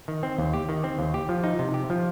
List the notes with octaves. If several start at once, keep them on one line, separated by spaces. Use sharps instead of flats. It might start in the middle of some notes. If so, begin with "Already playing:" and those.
D#3
C4
D#2
G4
D#3
C4
D#2
G4
F3
D#4
C3
G4
F3